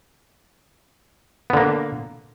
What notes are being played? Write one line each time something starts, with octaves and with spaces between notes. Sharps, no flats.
D3 A#3 B3